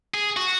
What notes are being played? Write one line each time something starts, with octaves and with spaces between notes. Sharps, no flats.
G#4
F#4